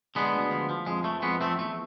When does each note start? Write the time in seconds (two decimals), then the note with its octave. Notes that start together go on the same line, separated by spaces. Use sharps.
0.15 D3 G#3 B3
0.34 D2
0.51 F3
0.70 F3
0.87 F2 G#3
1.04 E3 A3
1.22 F2 G#3 B3
1.40 F2 A3 C4
1.58 E2 A3